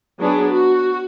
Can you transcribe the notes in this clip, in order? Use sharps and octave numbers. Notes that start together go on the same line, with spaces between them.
F#3 B3 D4 G#4
F#4